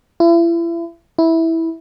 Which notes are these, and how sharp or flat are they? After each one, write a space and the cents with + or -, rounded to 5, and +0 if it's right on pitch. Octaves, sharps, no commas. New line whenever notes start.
E4 +35
E4 -10